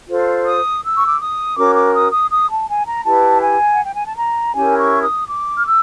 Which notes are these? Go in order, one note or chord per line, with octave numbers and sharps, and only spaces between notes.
F4 A4 C5
D#6
E6
C#6
D6
D#6
C#4 F#4 A#4 D6
D6
D#6
D#6
D#6
A5
G#5
A#5
E4 G4 B4 A5
G#5
F#5
G5
G#5
A5
A#5
C#4 E4 G4 A#4 G#5
C#6
D#6
D6
F6
E6